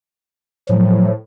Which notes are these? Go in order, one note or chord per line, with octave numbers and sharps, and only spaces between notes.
A2 F3 F#3